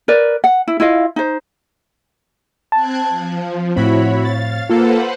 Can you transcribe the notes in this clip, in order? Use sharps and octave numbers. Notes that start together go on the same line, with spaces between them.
A#4 B4 D5
F#5
E4
E4 F4 D#5 F5
D#4 C5
C4 A5 F#6 G#6
F3
A2 C4 E4 F#4 C#5 B5
F5 A6
A#3 F4 A4 B4 C5 F#5